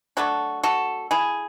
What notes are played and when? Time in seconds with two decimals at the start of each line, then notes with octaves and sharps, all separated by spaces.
0.17 F#3 A3 D4 F#4 A4
0.63 F#4 A4
1.11 E4 G#4